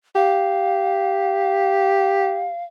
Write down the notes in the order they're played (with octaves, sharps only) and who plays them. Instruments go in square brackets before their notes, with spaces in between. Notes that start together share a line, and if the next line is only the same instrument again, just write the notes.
[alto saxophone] G4 [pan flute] F5